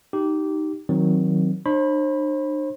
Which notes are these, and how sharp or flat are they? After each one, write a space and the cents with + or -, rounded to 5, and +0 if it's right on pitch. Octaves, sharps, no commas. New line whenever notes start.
D#4 +0 G4 -15
D#3 +15 F#3 -5 C4 +0
D4 +45 C5 +40 B5 +0